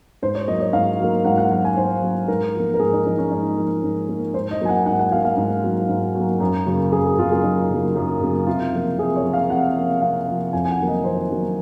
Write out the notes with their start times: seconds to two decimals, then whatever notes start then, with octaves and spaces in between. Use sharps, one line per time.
0.22 G#2 C5
0.35 C#5
0.47 F#3 A#3 D#5
0.60 C#5
0.73 G#2 F5
1.00 F#3 A#3
1.25 G#2 F#5
1.38 F#5
1.50 F#3 F#5
1.55 A#3
1.65 G#5
1.77 G#2 C5
2.02 F#3 A#3
2.28 G#2 A#4
2.54 F3 A#3
2.74 A#4
2.79 G#2 G#4
2.93 D#4
3.05 F3 A#3 D#4
3.18 C#4
3.32 G#2 D#4
3.57 F3 A#3
3.83 G#2
4.09 F3 A#3
4.34 G#2 C5
4.51 D#5
4.61 F#3 A#3 G#5
4.69 F#5
4.86 G#2 F#5
4.99 F#5
5.11 F#3 F5
5.16 A#3
5.24 F5
5.37 G#2
5.63 F#3 A#3
5.89 G#2
6.15 F#3
6.20 A#3
6.40 F#2
6.66 C#3 F#3 A#3
6.92 F#2 G#4
7.05 G#4
7.18 C#3 F#3 A#3 F4
7.31 G#4
7.44 F#2 D#4
7.70 C#3 F#3 A#3
7.96 F#2
8.21 C#3 F#3 A#3
8.46 C3 F4
8.73 F3 A#3
8.98 C3 G#4
9.16 C#5
9.25 F3 A#3
9.33 F5
9.50 C3 F#5
9.75 F3 A#3
10.02 C3 F5
10.28 F3 A#3
10.53 F2 G#5
10.65 G#5
10.70 F#5
10.79 D#3 F#3 A#3
10.88 D#5
11.04 F2 C5
11.30 D#3 F#3 A#3